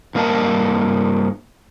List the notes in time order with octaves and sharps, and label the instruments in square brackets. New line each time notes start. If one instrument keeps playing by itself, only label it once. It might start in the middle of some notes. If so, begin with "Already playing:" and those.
[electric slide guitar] G2 A#3 A#4 D#5 A5 A#5